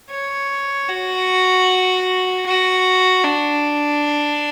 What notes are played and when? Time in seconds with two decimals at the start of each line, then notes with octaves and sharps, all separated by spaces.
0.11 C#5
0.89 F#4
2.46 F#4
3.25 D4